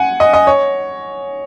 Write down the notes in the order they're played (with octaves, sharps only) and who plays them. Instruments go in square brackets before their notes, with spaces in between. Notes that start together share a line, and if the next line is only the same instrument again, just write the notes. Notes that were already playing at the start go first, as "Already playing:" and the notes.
Already playing: [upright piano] F#5 G#5
D#5
D#5
C#5